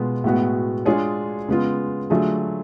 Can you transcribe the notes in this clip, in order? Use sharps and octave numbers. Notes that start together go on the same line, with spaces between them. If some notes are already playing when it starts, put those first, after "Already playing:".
Already playing: B2 G#3 B3 F4
A2 G#3 B3 F#4
G#3 D4 F4 G#4 C#5
C#3 G#3 B3 F4
D3 F#3 A3 F4 G#4